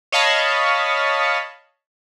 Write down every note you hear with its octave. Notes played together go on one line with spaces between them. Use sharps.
C#5 D#5 F5 A5 B5 C#6